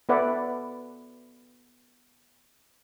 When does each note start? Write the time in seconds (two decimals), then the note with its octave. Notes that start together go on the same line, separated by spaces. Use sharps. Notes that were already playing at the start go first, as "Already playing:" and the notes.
0.09 B3 A4 B4 D5 E5 F#5